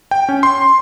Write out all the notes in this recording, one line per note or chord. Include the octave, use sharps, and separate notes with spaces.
G5
C#4
C6